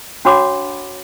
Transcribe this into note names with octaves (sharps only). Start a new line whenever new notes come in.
D4 F#4 C#5 F#5 B5 D6